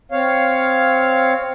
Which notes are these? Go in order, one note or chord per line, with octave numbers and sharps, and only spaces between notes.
C4 C#5 F5